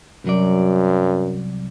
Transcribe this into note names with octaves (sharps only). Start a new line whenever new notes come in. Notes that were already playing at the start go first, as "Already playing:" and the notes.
C2 F#2 F#3 D5